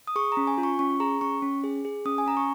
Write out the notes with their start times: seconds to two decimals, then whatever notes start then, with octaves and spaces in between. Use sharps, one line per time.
0.07 D#6
0.16 G#4 C#6
0.32 A#5
0.37 C#4
0.47 G#5
0.58 F4
0.63 C#6
0.79 C#4 C#6
1.00 G#4 A#5
1.21 C#4 C#6
1.42 C#4
1.64 G#4
1.85 G#4
2.05 C#4 D#6
2.18 G#5
2.26 C#4 A#5
2.37 C#6